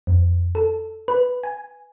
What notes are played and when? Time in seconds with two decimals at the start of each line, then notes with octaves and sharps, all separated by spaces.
0.07 F2
0.55 A4
1.08 B4
1.44 G#5